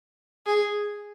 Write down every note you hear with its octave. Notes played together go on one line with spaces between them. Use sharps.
G#4